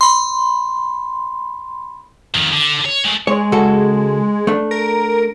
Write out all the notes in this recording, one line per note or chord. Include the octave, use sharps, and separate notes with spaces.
B5 C6
F2 D#3
D3
C#5
G#3 A3
G#3 C#5
C#3 F#4 A4
A3 D4
A#4